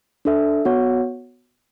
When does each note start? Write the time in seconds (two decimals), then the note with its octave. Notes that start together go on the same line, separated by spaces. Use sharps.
0.25 D4 A4 E5
0.65 B3 F#4 C#5 F#5